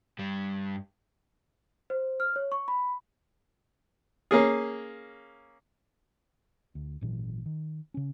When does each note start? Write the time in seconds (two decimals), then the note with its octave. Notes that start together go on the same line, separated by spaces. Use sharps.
0.19 G2 G3
1.90 C5
2.20 F6
2.36 C#5
2.52 C#6
2.68 B5
4.31 A#3 C#4 G#4
6.75 D2
7.01 G#1 A#2 E3 F#3
7.46 D#3
7.94 C#3 C#4